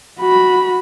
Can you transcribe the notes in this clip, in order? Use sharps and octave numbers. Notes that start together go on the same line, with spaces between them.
F#4 B5